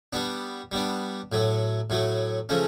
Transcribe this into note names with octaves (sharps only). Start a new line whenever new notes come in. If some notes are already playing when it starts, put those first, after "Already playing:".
G3 B3 D4
G3 B3 D4
A2 F#3 A3
A2 F#3 A3
C#3 F3 A3 C#4